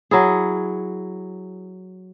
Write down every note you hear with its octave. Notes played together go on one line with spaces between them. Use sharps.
F#3 E4 G#4